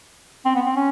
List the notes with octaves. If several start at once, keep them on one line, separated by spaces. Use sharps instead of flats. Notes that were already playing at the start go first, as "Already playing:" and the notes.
C4
B3
C4
C#4